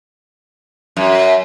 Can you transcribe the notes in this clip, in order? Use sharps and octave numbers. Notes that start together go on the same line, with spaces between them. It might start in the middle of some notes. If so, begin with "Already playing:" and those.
F#2